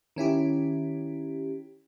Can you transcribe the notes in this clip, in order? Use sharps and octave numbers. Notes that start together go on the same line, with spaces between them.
D#3 C#4 E4 G4